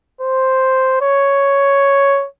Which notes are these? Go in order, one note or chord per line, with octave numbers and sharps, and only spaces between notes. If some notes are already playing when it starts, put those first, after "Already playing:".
C5
C#5